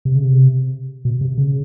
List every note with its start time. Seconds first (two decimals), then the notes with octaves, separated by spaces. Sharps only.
0.05 C3
0.15 C#3
0.24 C3
1.05 B2
1.21 C3
1.38 C#3